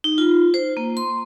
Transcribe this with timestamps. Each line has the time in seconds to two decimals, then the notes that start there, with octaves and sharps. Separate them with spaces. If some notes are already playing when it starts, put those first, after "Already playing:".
0.04 D#4
0.18 F4
0.54 C5
0.77 A#3
0.97 C6